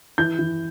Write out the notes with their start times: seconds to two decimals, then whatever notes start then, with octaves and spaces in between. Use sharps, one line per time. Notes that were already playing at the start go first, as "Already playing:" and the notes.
0.18 E3 G6
0.39 E3